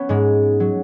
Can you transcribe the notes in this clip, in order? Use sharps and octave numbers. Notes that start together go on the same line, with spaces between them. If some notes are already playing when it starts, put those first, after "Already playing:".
Already playing: B3 C#4
G#2 G#3
F#3